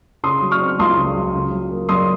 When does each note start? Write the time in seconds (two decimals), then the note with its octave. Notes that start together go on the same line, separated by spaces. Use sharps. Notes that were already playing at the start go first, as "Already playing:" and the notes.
0.23 C#3 C6 D#6
0.42 F#3
0.51 C#6 F6
0.61 C4
0.79 C#2 C6 D#6
0.97 C#3
1.16 F#3
1.34 C#3
1.52 F#3
1.71 A#3
1.89 F#2 C6 D#6